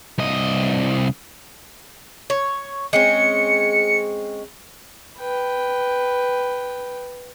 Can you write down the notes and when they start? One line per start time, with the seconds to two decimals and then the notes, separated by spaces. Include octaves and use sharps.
0.18 C2 D#5
2.30 C#5
2.93 G#3 C4 C#4 C#7
5.18 B4 G5